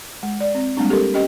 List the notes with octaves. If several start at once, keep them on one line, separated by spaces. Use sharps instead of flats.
G#3
D5
C4
G3 G#3 A#3 C4 D4
G4 A4 A#4
C#4 G4 D#5 G5